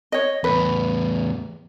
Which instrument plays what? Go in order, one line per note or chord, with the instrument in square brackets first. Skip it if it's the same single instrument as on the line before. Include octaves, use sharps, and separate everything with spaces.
[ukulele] C#5 D#5
[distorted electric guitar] E2 A2 [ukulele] B4